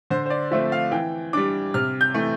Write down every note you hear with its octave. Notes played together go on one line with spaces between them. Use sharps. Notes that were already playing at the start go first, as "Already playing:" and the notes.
D3 C5
C5
D5
F3 A3 C4 E5
F5
E3 G5
G3 D4 D6
C3 F6
G6
E3 A3